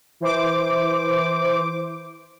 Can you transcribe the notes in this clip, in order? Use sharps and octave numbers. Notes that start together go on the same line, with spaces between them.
E3 C5 D6